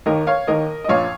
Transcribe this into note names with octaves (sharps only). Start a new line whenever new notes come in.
D#2 D#3 A#4 D#5
C#5 F5
D#2 D#3 A#4 D#5
D#5
A#1 A#2 F3 C#5 F5